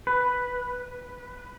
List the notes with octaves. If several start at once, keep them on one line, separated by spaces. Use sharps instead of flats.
B4